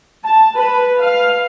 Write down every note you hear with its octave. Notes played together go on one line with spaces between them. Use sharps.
A5
B4
F5